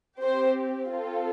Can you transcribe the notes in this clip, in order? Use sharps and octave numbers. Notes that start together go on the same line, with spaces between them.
C4 G4 C5
C4 F4 A4